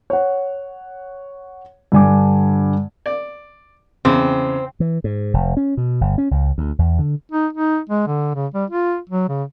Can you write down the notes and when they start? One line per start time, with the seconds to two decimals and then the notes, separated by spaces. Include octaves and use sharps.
0.10 C#5 F#5
1.92 G2 D3 G#5 D6
3.06 D5
4.05 E2 C#3 C4
4.80 E3
5.04 G#2
5.34 F1
5.57 C#4
5.77 B2
6.01 G1
6.18 C#4
6.31 C#2
6.58 D2
6.79 E2
6.99 D3
7.32 D#4
7.53 D#4
7.90 G#3
8.07 D3
8.35 C#3
8.55 G3
8.70 F4
9.10 F#3
9.29 C#3